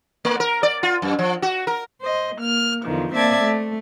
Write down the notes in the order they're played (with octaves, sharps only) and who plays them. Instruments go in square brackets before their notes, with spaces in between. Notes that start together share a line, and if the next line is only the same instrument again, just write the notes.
[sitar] A3
A#4
D5
F4
F#2
F3
F#4
A#4
[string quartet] C5 D#5
A#3 F6
E2 D3 D#3 F3
A#3 C4 D5 E5 A5 G#6
A3